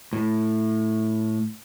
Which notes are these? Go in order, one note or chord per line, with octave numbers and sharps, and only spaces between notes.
A2